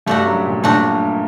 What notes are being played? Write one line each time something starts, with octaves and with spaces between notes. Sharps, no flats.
G2 G3 A3 D4 F#4
F#2 F#3
A#2
A#2 A3 D4 F#4